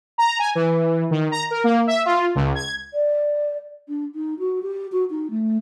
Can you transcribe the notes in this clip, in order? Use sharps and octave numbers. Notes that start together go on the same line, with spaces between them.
A#5
G#5
E3
D#3
A#5
A#4
A#3
E5
F4
C#2
G#6
D5
D4
D#4
F#4
G4
F#4
D#4
A3